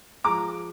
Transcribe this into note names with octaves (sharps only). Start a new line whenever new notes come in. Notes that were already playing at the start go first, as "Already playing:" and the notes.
F3 G#3 A#5 D6